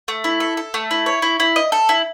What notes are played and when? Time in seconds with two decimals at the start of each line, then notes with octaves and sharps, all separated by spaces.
0.08 A3
0.24 E4
0.40 A4
0.57 A4
0.74 A3
0.91 E4
1.06 C#5
1.22 E4
1.40 E4
1.56 D#5
1.72 A4
1.89 E4